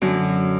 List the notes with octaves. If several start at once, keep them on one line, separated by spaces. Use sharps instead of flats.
F#2 D3 F#3